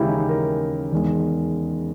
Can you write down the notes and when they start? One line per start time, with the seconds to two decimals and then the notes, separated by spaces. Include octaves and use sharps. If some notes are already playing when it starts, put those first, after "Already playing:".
Already playing: D#2 C#3 E3 G#3 C#4 E4 G4
0.08 D#4
0.29 A#4
0.92 E2 D#3 G#3